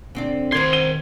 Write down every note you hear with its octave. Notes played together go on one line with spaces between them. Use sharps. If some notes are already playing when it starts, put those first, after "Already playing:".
D3 C4 D5
C3 D#3 A#4 C5 C6 G#6
D#7 G7